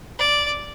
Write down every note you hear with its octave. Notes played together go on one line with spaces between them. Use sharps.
D5